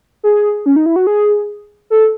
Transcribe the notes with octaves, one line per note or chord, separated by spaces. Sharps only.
G#4
C#4
D#4
E4
F#4
G#4
A4